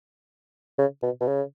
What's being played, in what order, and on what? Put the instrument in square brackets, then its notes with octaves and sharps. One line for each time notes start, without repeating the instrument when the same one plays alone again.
[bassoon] C#3
B2
B2
C#3